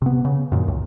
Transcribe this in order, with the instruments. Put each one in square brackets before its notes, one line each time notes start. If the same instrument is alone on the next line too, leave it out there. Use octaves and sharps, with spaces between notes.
[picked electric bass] C3 B3
C#3
F#2 A#2 D#3
C#2